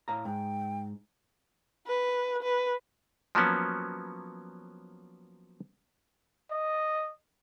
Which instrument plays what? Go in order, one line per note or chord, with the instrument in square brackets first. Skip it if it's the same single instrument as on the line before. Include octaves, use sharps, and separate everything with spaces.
[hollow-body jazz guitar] A2 F5 A#5
[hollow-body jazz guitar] G#2 [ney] G5
[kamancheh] B4
B4
[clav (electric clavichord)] F3 F#3 A#3 B3 C#4
[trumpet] D#5